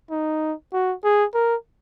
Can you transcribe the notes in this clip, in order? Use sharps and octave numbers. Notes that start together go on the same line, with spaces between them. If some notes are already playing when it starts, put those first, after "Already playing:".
D#4
F#4
G#4
A#4